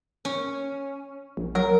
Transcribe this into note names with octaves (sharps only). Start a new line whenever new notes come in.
C#4
A#1
F#3 A#4